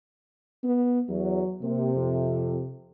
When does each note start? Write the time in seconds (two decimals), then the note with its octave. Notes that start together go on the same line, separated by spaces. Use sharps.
0.63 B3
1.09 E2 F#3
1.62 C3 A#3
1.96 F2